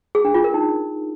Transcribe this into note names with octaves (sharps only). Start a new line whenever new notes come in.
G#4
D4
F4
A#4
D#4